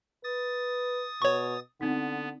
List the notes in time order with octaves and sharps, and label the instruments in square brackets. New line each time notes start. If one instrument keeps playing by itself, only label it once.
[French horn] B4 [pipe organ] D#6 A6
[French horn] B2 [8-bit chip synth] C#5 C#6
[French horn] D3 [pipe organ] B3 [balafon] C4 D#4